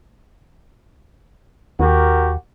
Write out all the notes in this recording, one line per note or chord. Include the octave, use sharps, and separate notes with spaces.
D#2 F#4 G4 A#4